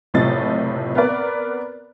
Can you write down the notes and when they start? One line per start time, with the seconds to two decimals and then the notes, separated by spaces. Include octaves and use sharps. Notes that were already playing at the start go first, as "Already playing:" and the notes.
0.14 F#1 A2 C3 F3 D#5 A6
0.95 B3 C4 A#4 B4 D5